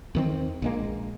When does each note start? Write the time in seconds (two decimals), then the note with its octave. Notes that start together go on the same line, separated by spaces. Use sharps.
0.15 E2 D#3 C4
0.62 A#1 G#3 A#3